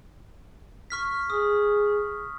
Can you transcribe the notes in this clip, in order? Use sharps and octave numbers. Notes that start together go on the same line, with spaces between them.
C#6 F6 B6
G#4 D#6